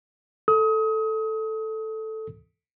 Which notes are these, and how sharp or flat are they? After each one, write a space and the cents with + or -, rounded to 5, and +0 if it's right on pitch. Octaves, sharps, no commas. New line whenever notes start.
A4 +0 D#6 +30